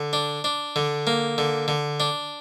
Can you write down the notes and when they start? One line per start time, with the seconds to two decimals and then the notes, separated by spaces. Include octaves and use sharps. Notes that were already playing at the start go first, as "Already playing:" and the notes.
Already playing: D3
0.13 D4
0.44 D4
0.76 D3
1.07 A#3
1.38 D3
1.68 D3
2.00 D4